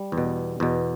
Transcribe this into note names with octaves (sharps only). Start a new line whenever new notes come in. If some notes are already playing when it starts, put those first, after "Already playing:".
Already playing: G3
E2
B2
E2 B2